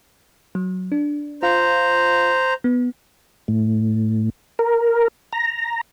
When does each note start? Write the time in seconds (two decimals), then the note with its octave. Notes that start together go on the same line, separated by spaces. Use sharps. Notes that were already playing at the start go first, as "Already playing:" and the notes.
0.55 F#3
0.92 D4
1.43 F4 C5 F5 A#5
2.64 B3
3.48 A2
4.59 A#4
5.33 A#5